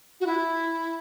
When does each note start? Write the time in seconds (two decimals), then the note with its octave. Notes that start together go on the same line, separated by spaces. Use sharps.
0.20 F#4
0.26 E4